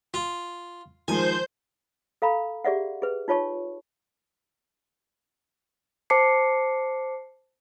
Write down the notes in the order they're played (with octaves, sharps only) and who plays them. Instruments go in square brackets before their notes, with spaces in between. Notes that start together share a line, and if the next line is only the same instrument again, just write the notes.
[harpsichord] F4
[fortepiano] D#3 F3 G#3 [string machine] C5 G6 [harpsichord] G#5
[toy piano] A4 F5 A#5 B5
G4 G#4 D5 E5 F#5
G#4 B4
D#4 F4 C#5 A5 C#6
[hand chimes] C5 A5 D6 C7 C#7